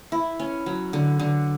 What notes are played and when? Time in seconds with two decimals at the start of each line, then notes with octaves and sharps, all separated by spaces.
0.12 E4
0.39 C#4
0.66 F#3
0.93 D3
1.20 D3